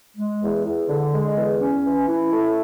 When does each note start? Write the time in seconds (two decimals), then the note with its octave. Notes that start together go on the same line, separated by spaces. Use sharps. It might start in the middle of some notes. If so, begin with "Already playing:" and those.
0.17 G#3
0.42 E2
0.65 E2
0.89 D3
1.13 G#3
1.36 E2
1.61 C#4
1.85 E3
2.08 E4
2.32 A3